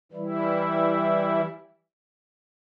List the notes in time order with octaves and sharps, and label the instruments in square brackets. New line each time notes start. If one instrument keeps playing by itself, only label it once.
[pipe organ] E3 G3 E4